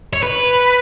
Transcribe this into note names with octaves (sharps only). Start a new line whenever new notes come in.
C#5
B4